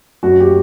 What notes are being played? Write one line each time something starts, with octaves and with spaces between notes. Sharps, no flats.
F#2 F#4
G4